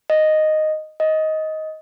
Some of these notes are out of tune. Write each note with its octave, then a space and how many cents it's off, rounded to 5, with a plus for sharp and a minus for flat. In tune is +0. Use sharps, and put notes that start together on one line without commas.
D#5 -5
D#5 +15